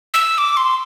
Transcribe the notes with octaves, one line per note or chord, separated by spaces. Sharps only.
E6
D6
C6